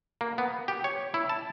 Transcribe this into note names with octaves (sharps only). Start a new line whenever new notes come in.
A#3
B3
G4
C#5
E4
A5